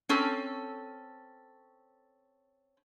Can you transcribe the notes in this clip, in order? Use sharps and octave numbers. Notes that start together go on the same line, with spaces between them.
C4 C#4 A4